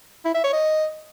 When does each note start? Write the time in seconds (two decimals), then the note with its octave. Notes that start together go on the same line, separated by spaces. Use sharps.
0.25 E4
0.34 E5
0.44 C#5
0.53 D#5